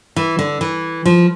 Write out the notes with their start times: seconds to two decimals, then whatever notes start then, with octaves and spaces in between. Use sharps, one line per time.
0.16 E3
0.39 D3
0.61 E3
1.05 F3